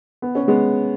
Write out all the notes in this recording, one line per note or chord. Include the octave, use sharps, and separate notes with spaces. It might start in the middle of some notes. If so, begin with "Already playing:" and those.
B3
C#4
G#3 B3